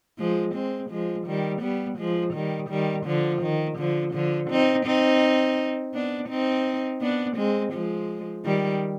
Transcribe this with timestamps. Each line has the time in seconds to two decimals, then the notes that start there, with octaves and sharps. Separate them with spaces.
0.18 F3 G#3
0.54 G#3 C4
0.91 F3 G#3
1.26 D#3 G3
1.62 G3 B3
1.98 F3 G#3
2.34 D#3 G3
2.70 D#3 G3
3.06 D3 F3
3.42 D#3
3.78 D3 F3
4.14 D3 F3
4.50 C4 D#4
4.86 C4 D#4
5.94 B3 D4
6.29 C4 D#4
7.01 B3 D4
7.37 G#3 C4
7.73 F3 G#3
8.45 D#3 G3